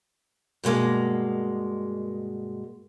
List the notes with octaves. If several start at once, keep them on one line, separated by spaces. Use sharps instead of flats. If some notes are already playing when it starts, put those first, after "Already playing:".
G2 B2 G#3 A#3